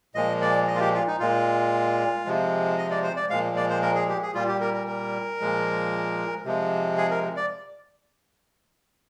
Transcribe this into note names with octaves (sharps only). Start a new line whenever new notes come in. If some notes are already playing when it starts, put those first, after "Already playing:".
A#2 F3 G#3 D#5
D5
D#5
F4
G4
F4
D#4
A#2 G#3 F4
C3 F3 G#3
D#5
D5
C5
D5
A#2 F3 G#3 F5
D5
C5
A#4
G#4
G4
G#4
A#2 G3 F4
G4
A#4
A#4
A#4
A#2 F3 G#3
C3 F3 G#3
G#4
A#4
D5